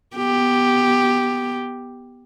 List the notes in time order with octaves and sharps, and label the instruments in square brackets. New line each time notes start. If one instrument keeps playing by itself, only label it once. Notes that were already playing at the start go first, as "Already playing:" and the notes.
[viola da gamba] B3 G4